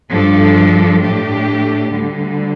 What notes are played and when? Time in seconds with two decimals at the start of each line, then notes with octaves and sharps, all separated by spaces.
0.10 G2 F3 D4 A4
1.01 A2 A3 D4 G4
1.92 D2 D3 G3